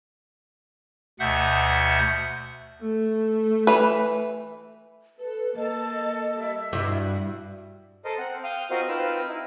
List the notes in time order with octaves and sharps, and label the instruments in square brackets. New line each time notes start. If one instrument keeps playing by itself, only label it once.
[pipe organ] D2 B2 E5 F#5 G6
[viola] A3
[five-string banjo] E3 B4
[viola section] A4 [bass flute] B4
[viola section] A#3 A5 [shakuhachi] A4 [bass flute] D#5
[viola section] G3 [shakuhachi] E5
[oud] G2 E4 [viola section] F#4
[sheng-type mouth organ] A4 A#4 C5 D#5
C4 F#5
F5 G5 D#6 F6
C4 F4 F#4 A#4 C5 D#5
C4 D#4 F4 A#4 B4 E6
D#4 E4